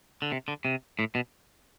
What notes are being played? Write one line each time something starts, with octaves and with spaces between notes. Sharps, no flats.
D3
C3
D3
C3
A2
B2